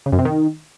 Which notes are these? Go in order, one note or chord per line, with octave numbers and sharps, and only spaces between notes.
C#3
F#2
C3
D#3